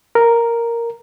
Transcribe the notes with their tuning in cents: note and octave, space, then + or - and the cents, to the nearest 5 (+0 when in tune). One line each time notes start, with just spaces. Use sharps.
A#4 +0